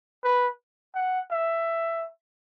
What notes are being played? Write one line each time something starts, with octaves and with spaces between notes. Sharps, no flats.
B4
F#5
E5